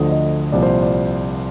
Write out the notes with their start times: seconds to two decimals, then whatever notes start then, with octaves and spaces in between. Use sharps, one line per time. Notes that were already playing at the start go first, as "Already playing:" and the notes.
Already playing: D2 D3 F3 D#5
0.12 D#5
0.52 C2 A#2 F3 D5
0.63 C5
0.83 D5